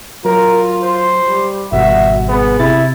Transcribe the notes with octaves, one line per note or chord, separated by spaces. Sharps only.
F#3 F4 A#4
C5
G3
G#1 B2 G3 F#4 E5
B3 G#4
C3 E4 A6